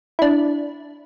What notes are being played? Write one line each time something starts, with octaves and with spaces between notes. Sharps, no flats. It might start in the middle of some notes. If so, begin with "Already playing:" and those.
D4 E4